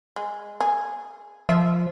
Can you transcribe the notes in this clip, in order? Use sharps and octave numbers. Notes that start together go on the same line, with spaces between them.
G#3
G#4
F3 E5